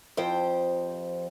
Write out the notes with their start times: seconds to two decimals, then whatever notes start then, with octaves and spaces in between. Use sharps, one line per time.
0.17 F2 F3 G4 C5 G5